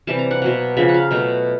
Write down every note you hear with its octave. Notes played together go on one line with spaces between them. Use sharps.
C3 E3 G3 A5
A#5
F#5
B2 F#3 A#3 F#5
C#3 F3 A#3 E5
F#5
F5
B2 F#3 A3